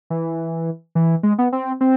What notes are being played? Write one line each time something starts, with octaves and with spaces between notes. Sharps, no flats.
E3
E3
G#3
B3
C4
C4